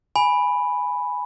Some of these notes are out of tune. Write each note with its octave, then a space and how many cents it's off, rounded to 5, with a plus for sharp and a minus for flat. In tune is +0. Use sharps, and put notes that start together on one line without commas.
G#5 +0 B5 +0